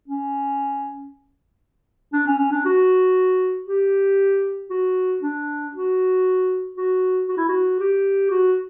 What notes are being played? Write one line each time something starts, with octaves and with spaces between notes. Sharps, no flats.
C#4
D4
C#4
C#4
D4
F#4
G4
F#4
D4
F#4
F#4
F#4
E4
F#4
G4
F#4